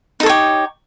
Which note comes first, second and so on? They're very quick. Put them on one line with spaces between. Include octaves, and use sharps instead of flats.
D#4 A4 C#5 G4